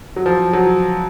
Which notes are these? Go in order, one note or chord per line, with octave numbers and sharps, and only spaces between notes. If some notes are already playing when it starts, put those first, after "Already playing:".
F#3
F3
F#3